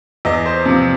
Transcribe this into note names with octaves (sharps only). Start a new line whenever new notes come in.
E2 D#5
C5
C3 F3